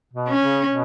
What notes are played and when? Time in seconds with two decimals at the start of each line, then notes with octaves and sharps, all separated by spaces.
0.14 B2
0.28 C#4
0.42 C#3
0.69 B2